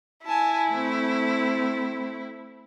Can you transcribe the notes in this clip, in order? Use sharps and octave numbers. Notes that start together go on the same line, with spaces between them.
E4 G#5 A5
A3 C4